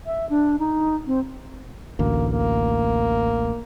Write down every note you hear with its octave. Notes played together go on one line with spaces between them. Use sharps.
E5
D4
D#4
C4
A1 D2 A#3
A#3